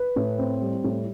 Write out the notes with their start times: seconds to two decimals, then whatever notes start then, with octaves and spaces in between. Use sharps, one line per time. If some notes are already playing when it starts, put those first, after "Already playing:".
Already playing: B4
0.16 A2
0.38 C4
0.61 G3
0.84 A2